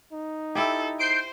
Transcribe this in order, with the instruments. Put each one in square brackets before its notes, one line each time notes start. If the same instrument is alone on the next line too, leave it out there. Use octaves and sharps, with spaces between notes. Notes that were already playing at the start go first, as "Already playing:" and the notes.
[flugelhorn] D#4
[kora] E4 G4 [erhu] A4
[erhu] C5 [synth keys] G6 C7 D7